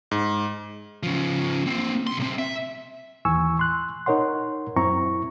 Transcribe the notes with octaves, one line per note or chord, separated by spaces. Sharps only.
G#2
C#3 F3
A#3 C4
B1 C6
B1 C4
E5
D#2 E3 G#5 C#6 E6
C6 F#6
D#4 A#4 C#5 F#5 C6
F#2 C4 E4 A#5 C#6